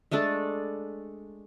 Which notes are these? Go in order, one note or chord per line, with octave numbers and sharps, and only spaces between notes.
G#3 A3 D4 A4